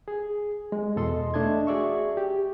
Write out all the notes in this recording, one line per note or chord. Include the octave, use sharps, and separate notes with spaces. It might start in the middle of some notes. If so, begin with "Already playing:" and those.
G#4
G#3
E2 B2 A4 D#5 C6
A3 D4 D#5 A5 G#6
F#4 G#4 D5 E5 C#6
G4